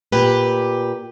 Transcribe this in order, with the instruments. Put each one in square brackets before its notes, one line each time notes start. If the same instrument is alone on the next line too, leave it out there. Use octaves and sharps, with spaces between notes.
[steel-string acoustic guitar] A#2 G4 B4